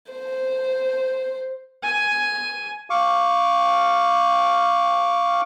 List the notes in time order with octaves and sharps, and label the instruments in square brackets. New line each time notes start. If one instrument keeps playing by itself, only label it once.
[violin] C5
[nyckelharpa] G#5
[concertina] F5 C#6 D6